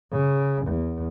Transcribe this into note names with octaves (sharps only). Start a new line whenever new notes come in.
C#3
E2